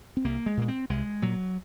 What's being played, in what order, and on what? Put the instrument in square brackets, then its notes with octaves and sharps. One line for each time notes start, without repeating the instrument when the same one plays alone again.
[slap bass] C4
C2 A#3
G#3
A#2 A#3
C4
C2 G#3
A#2 F#3